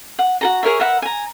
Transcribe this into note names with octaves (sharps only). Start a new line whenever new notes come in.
F#5
F#4 A4 A#5
G#4 A#4 C#5 E5
A#4 B4 E5 F#5
G#5 A#5